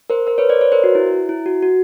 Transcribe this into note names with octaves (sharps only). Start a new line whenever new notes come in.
A#4 C5
A#4 C5
B4 C#5
C5 D5
B4 C#5
A#4 C5
F#4
E4
E4
F#4
F#4